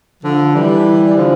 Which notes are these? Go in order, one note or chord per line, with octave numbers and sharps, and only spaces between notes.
D3 F3
E3 G3
G3
D3 F3